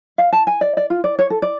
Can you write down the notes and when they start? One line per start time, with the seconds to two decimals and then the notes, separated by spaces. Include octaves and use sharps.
0.18 F5
0.33 A5
0.47 G#5
0.61 D5
0.77 D5
0.90 F4
1.04 D5
1.19 C#5
1.30 A4
1.42 D5